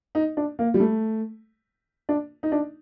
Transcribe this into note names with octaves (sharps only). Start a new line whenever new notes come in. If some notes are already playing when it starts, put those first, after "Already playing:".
D#4
D4
A#3
G3
A3
D4
D#4
D4